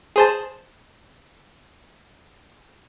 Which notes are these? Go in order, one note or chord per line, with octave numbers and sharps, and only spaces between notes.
G#4 C5 A5